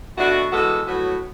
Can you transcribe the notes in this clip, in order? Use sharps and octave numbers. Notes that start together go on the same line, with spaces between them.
B2 A3 D4 F#4
E3 G#3 B3 F#4 A4
A2 F#3 B3 F#4